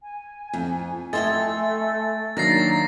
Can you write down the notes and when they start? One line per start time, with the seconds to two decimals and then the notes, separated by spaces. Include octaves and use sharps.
0.03 G#5
0.53 F2
1.13 A3 A4 D#5 E5 G5 G#5 C6 A6
2.37 D#3 F#3 A#3 D4 A#5 A6 A#6 C7